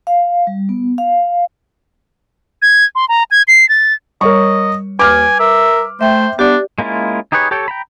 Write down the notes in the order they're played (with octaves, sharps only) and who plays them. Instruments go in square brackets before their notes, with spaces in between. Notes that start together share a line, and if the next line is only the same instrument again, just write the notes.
[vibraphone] F5
G3
B3
F5
[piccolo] G#6
C6
A#5
G#6
C7
A6
[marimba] G3 [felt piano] A#4 C#5 C#6 [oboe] D#5
[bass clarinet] D#2 [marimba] B4 [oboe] G#5 [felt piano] D6 F6
[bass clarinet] A#4 [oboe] E5
[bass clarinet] A3 [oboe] C5 [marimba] E5 G5
[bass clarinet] B3 [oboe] D4 [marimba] G4 D5
[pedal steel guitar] G#3 A#3 C#4 E4 F4
D#4 G4 G#4 B4 C#5
G4 A4 C#5 G5
G5 A#5 B5